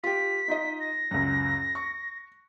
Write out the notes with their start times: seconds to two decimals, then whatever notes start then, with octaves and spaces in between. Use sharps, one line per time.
0.04 F4 G4 B6
0.48 D#4 F4 D#5
0.80 A#6
1.11 C#2 F#2
1.75 C#6